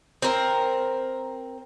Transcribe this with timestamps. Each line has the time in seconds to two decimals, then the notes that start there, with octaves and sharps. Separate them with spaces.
0.22 C4 A#4